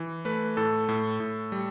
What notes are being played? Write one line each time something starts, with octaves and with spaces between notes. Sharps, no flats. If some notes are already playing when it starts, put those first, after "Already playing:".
Already playing: E3
A3 B4
A2 A4
A2
A2
G3